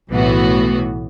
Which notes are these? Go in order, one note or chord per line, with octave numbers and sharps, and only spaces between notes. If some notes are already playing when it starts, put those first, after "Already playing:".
B1 A2 E3 B3 F#4